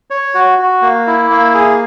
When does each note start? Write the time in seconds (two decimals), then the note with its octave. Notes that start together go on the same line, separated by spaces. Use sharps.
0.10 C#5
0.34 F#4
0.59 F#4
0.82 A#3
1.07 E4
1.30 A#3
1.54 G#4